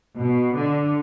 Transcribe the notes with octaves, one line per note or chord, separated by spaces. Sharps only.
B2
D3